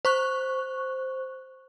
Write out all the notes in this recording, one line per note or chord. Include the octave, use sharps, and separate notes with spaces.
C5 C#6 F#6